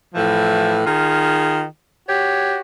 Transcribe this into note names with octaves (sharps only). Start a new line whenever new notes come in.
A2 E3 F3
D#3 F4 G#4
F#4 G4 C#5